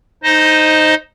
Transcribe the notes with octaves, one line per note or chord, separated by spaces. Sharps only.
D#4 C5 D#5